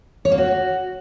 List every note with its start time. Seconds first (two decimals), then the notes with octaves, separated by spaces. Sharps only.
0.25 C#5
0.32 A#3
0.38 F#4